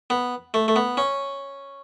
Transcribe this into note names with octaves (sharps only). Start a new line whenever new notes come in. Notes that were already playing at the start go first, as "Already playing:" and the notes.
B3
A3
A3
B3
C#4